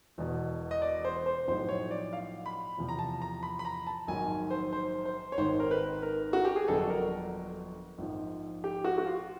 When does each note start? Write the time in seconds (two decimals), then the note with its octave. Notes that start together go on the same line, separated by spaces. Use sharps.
0.18 E1 E2 B2
0.71 D#5
0.82 D5
1.04 C5
1.26 C5
1.47 B1 A2 F3 C5
1.69 C#5
1.91 D5
2.13 F5
2.46 B5
2.78 E2 C3 F3
2.89 A#5
2.99 A5
3.22 A#5
3.43 B5
3.59 B5
3.65 A#5
3.87 A5
4.07 A#1 G#2 D#3 F#3 G#5
4.51 C5
4.73 C5
5.05 C5
5.32 C#5
5.37 G#1 G#2 D#3 C5
5.60 A#4
5.71 B4
6.03 A#4
6.33 F#4
6.45 G4
6.56 G#4
6.68 G1 F2 D3 F#3 A4
6.90 A#4
7.98 A#1 G#2 F3
8.64 G4
8.85 F#4
8.98 F#4
9.06 F4